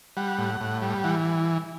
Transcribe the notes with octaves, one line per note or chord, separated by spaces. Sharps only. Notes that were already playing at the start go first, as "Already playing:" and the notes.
G3 F#5
A2
A2
G3
E3 F#5